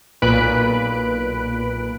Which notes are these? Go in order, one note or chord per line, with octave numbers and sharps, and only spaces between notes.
B1 A#2 B4 B5 F#6 D7